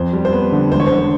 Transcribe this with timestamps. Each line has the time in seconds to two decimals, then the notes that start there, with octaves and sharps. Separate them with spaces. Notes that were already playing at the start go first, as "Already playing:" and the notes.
Already playing: F2 C5
0.13 G3
0.25 C5
0.33 B3 B4
0.52 D3
0.72 E1 C5
0.80 C#5
0.87 D3 C5